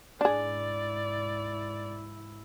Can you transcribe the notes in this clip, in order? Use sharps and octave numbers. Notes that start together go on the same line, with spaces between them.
G#2 D4 E4 G#4 D5